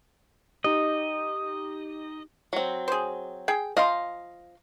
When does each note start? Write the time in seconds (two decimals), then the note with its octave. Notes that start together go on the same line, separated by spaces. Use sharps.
0.64 D#4 G4 D#5
2.53 F#3 C4
2.88 G#4 C5
3.48 G#4 G5
3.77 F3 D#5 F5 C6